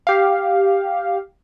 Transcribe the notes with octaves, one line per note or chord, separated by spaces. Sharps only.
G4 F5